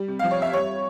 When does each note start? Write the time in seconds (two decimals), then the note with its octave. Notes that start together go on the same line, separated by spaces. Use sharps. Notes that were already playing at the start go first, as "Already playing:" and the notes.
Already playing: G3
0.08 C3
0.19 F5
0.23 F3
0.31 C#5
0.38 F2 E5
0.53 G3 C#5